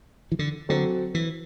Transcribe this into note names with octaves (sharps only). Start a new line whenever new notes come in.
E3
D3
D3 F#3 C4 F#4 A4
E3